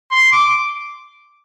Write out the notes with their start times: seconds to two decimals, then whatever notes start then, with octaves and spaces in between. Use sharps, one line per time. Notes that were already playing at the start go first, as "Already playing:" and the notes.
0.11 C6
0.32 D6